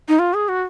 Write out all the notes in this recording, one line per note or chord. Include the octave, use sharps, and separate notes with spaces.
D#4
F4
G#4
F#4